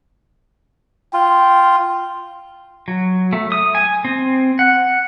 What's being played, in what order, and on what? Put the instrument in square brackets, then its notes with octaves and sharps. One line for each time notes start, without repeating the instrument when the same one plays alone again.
[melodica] F4 [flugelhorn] G5
[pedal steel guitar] F#3
A3
D#6
G#5
C4
F#5